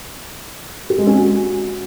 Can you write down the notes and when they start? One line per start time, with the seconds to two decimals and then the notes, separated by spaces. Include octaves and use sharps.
0.90 G4
0.98 G#3
1.07 C#4
1.15 F#4